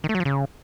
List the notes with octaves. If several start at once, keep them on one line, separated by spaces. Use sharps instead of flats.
D#3
A3
F#3
F3
C#3